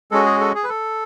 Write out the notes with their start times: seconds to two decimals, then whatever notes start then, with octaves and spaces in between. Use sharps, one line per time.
0.11 G#3 C#4 F#4 A4
0.26 G#4
0.40 A4
0.55 G#4
0.64 B4
0.69 A4